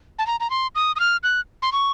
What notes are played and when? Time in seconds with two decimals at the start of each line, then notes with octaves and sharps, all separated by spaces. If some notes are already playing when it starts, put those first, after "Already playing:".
0.19 A5
0.27 A#5
0.40 A#5
0.50 C6
0.75 D#6
0.96 D#6
1.00 F6
1.23 F#6
1.62 C6
1.72 C#6